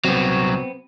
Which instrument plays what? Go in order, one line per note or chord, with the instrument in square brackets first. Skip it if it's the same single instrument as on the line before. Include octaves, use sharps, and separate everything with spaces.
[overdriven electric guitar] C2 F#3 [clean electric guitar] B3 C4